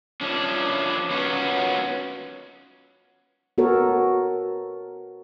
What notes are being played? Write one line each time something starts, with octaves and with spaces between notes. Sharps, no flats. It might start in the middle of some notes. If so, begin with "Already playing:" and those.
F3 C#4 D4
B3 C#4 F4 F#4
B3 F#4 A4 A#4 C#5